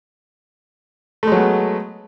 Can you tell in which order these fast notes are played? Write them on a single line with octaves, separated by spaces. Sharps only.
A3 G#3 F#3 B3